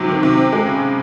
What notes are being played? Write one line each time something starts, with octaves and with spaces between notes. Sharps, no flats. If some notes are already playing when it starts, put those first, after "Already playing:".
Already playing: G#2 C3 F#3
D#3
C3
C4
G#3
C#3